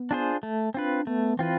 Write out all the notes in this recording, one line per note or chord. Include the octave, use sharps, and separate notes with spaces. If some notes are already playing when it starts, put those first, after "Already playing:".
Already playing: B3
D4 F4 G#4 C5
A3
C4 D4 F4 B4
A3 B3
E3 C4 F4 B4